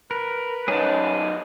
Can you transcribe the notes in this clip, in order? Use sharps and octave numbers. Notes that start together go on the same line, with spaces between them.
A#4 B4
F#2 C#4 D#4 G#4 A5